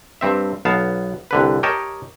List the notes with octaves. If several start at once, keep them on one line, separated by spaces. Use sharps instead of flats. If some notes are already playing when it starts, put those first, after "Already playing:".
G2 C4 E5
B1 B3 F5 A5
C2 D3 B4
G4 A#4 C#5 D#5 G5 A5